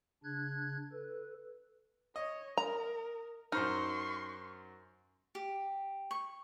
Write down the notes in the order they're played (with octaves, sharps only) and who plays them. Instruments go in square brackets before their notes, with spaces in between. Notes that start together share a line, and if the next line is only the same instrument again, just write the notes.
[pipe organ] C#3 D4 F#6 G#6
A4 B4
[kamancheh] C#5 [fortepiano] D#5
[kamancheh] A#4 [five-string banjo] A#5
[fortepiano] F#2 C5 F6 [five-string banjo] D#4 [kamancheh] C6 C#6
[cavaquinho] G4
C#6